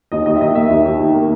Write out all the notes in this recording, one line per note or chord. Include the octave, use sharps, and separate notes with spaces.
D#2 D#5
D#2 D#5
E5
D#3 D#5
A#3 E5
D#2
D#2
D#3
A#3